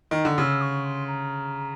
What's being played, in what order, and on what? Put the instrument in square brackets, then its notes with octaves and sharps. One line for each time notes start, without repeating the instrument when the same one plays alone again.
[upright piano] D#3
D3
[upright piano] C#3 [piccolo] E6
[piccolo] C#6
C6
A#5